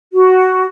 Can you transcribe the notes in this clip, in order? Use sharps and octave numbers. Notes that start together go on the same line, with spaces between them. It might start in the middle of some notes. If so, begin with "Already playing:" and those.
F#4